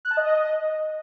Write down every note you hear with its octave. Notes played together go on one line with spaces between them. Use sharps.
F#6
A5
D#5